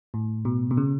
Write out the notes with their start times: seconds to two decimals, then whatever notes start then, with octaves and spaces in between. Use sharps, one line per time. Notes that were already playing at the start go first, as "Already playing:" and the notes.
0.14 A2
0.45 B2
0.71 B2
0.77 C#3